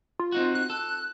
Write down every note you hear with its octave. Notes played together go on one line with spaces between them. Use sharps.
F4
C4 D#4 F#4
F#6
A4